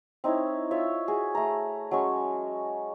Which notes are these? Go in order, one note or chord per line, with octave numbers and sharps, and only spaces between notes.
C4 D#4 E4 C#5
F4 C#5 E5
F#4 G#4
A3 A#5
F#3 G#3 C#4 C#6